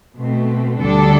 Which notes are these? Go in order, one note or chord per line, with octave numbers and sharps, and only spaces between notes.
B2 A3 C4
D2 D3 G3 D4 A4